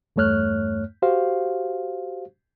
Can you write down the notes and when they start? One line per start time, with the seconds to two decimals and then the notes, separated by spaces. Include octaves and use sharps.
0.16 E2 G2 A3 C#5 F6 F#6
1.02 F#4 G4 C5 F5